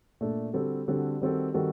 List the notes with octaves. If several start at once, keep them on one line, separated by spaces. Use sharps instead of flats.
A#2 A3 D4 A4
D3 G3 C4 F#4 A4
D3 G3 C4 F#4 A4
D#3 G3 C4 F#4 A4
D#3 G3 C4 F#4 A4